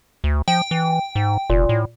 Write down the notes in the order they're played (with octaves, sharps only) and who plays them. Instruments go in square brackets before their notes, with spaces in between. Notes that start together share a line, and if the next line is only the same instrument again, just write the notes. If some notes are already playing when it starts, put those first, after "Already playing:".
[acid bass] D2
[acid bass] F3 [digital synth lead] G5
[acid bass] E3
G#2
[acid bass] F1 [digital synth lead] A#2
[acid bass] A2